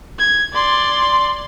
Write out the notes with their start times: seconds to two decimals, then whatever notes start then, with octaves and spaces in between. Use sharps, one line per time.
0.19 G#6
0.53 D5 C6